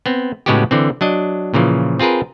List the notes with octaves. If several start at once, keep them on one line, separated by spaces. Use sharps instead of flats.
B3 C4
A2 C#3 G#3 B3 F#4 G4
D3 E3 C4
F#3 D4 D#5
A#2 C#3 E3 F3
C4 F4 G#4 A#4 B4